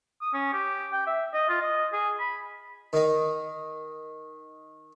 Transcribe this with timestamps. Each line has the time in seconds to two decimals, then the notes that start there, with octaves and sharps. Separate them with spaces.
0.22 D#6
0.34 C#4
0.53 G4
0.93 G5
1.07 E5
1.34 D#5
1.49 F4
1.62 D#5
1.93 G#4
2.20 B5
2.93 D#3 D#4